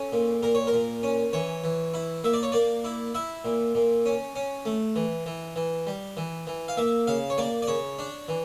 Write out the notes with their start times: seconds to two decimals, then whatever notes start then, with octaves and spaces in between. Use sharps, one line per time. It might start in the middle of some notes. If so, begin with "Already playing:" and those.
Already playing: C#4 A4
0.13 A#2
0.43 A#2 A#4
0.55 C#5
0.67 A#4
0.73 A#2
1.03 C#4
1.33 E3 C#5
1.64 E3
1.94 E4
2.24 A#3 E5
2.33 D5
2.43 C#5
2.52 A#3 D5
2.84 E4
3.15 E4 E5
3.45 A#2
3.75 A#2
4.06 C#4
4.35 C#4
4.65 A3
4.96 E3
5.26 E3
5.56 E3
5.87 G3
6.17 E3
6.47 E3
6.68 F5
6.77 A#3 E5
7.07 C#3 F5
7.30 C#5
7.38 A#3 D5
7.62 D5
7.68 C#3 C#5
7.99 D4
8.28 E3